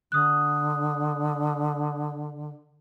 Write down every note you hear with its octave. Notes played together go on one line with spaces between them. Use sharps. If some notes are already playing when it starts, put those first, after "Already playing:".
D3 D#6 F#6